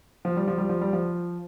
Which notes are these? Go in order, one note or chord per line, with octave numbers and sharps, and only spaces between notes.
F3
G3
F3
G3
F3
G3
F3